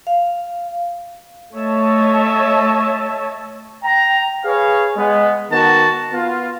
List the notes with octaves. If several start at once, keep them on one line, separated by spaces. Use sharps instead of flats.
F5
A3 C#5 D#5 E5 A5
G5 A#5
G#4 B4 C#5 F5
G#3 B3
D#3 B3 F#4 A5
B3 F4